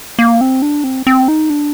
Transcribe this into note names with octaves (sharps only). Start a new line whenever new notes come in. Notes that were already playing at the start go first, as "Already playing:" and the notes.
A#3
C4
D4
C4
C4
D#4
D4